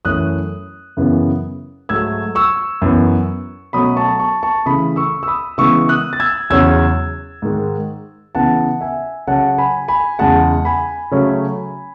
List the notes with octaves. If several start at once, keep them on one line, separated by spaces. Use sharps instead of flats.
F#2 E3 A3 C#4 D#6 F#6
F#2 C#3 E3 B3
G#2 F#3 A3 E6 G#6
C#6 E6
F#2 E3 B3
B2 F#3 A3 C#4 B5 D#6
A5 C#6
A5 C#6
A5 C#6
C#3 E3 A3 B5 D#6
C#6 E6
E6
B5 D#6
C#3 E3 G#3 B3 C#6 E6
D#6 F#6
A6
E6 G#6
E2 C#3 F#3 C#4 E6 G#6
G#2 D#3 G#3
C#3 E3 B3 F#5 A5
E5 G#5
C#3 F#3 C#4 F#5 A5
G#5 B5
G#5 B5
E2 C#3 G#3 F#5 A5
G#5 B5
C#3 F#3 A3 C#4